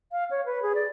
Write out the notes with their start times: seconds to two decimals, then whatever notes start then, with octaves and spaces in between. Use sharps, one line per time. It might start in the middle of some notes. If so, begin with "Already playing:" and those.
0.12 F5
0.31 C#5
0.46 B4
0.62 G#4
0.75 D5